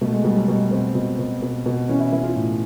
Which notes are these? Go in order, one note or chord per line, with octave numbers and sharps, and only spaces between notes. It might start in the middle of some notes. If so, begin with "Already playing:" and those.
B2 A3
G#3
B2 G3
F#3
B2 G3
B2 C4
B2
B2
B2
B2
E3 C#4
E4
E3 E4
F4
A2